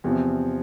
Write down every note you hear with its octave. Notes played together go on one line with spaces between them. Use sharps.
E2 C3 F3 C4